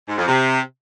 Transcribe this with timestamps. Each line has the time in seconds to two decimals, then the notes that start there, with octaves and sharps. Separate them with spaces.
0.08 G#2
0.18 F2
0.27 C3